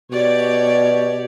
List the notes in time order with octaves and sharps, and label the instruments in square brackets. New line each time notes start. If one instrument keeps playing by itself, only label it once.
[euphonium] B2 [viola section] G4 C#5 D5